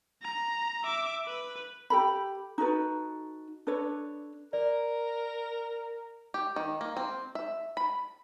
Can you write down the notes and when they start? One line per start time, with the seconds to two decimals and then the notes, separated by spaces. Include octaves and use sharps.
0.22 A#5
0.83 E5 D6
1.26 B4
1.90 G4 A4 B5
2.58 D#4 F#4 A4 B4
3.67 D4 A4 B4 C#5
4.53 A#4 D5
6.34 G4
6.56 D#3
6.81 A#3
6.97 C4
7.35 E5
7.77 B5